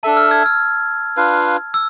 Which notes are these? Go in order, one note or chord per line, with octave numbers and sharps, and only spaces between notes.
D4 A4 E5 A5
F6
E6 G#6
F6
D4 F4 B4 F5
E6